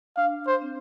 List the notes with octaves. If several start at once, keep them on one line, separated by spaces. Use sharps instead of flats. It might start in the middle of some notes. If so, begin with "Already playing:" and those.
D4 F5
C5
C4